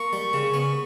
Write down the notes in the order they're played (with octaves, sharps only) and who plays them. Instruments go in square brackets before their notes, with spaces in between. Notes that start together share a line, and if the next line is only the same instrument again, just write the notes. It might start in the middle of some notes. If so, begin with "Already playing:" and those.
Already playing: [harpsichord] A#3 [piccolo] C#6
[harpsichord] G3
C#3
B3